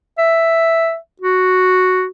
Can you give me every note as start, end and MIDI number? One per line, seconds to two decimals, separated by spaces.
0.18 0.96 76
1.21 2.06 66